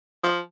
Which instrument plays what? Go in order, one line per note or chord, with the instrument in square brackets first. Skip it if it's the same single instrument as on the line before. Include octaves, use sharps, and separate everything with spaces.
[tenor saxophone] F3